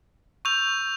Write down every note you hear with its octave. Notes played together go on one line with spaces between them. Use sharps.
C#6 E6 G6 F7